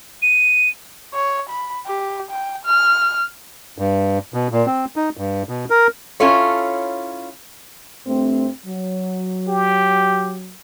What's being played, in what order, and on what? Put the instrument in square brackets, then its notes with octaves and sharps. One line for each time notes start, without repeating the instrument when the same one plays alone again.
[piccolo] D#7
[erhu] C#5
B5
G4
G5
F6
[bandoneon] G2
B2
A#2
C4
D#4
G2
B2
A#4
[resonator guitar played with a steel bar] C#4 E4 F4 A4 C#5
[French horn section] G2 A3 C4
F#3
[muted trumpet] G4